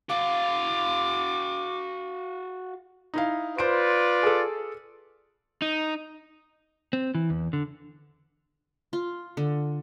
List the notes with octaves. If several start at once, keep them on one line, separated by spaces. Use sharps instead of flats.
F#4 F5 D6
D#4 E4 F5
F4 B4 C5 D5 D7
G#4 A4
D#4
C4
E3
E2
D3
F4
D3